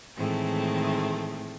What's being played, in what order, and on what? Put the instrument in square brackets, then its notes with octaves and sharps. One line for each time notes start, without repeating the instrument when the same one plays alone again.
[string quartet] A2 D#3 E3 G#3 A3 C4